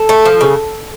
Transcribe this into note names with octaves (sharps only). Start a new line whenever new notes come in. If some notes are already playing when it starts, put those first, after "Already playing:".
Already playing: A4
A3
F3
C#3